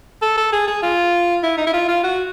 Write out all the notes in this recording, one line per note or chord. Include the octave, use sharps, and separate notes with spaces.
A4
A4
G#4
G#4
F4
E4
D#4
E4
F4
F4
F#4